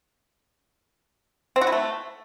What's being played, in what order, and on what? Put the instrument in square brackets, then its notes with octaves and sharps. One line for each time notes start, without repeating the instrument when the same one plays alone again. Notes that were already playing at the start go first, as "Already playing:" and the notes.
[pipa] C4
F#4
E4
A3